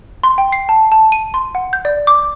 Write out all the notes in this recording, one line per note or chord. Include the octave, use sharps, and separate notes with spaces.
C6
G5
C7
A5
A5
D#7
C6
F#5
G6
D5
D6